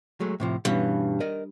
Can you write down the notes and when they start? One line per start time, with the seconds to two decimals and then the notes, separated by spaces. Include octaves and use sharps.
0.20 F#3 G#3 A3
0.40 A2 C3 F3
0.65 G2 B2 E3 C#4
1.20 A#4 D5 D#5